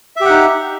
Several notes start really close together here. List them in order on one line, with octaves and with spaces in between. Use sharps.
E5 G4 F#5 D#4